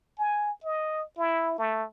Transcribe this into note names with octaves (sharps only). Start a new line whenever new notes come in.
G#5
D#5
E4
A3